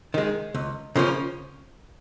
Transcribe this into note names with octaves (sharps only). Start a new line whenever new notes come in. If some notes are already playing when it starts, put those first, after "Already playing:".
D#3 G#3
C#2
C#3 F3 A#3 C#4